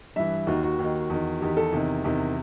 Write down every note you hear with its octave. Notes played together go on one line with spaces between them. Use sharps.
G2 E3 E5
D#2 D#3 F#4
F#4
D#2 D#3
E2 D#3
E2 D#3 G4
A4
E2 C3 D#3
E2 C3 D#3